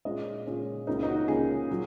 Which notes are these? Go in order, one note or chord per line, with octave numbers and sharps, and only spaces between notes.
A#2 G#3 C#4 D#5
A#2 G#3 C#4
C#2 C#3 A#3 C#4 D#4
D#4
F#4
C#2 C#3 A#3 C#4 G#4
A#2 F#3